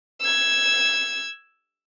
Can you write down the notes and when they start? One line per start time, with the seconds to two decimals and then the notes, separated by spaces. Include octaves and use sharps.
0.21 E6 G#6